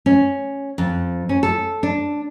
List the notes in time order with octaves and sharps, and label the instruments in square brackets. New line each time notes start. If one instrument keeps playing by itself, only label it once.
[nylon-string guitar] C#4
F2
C#4
A4
D4